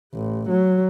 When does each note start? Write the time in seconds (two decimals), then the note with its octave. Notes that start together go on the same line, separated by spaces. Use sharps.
0.14 A1
0.50 F#3